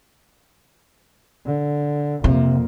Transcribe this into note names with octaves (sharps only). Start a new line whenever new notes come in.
D3
F2 C3 A#3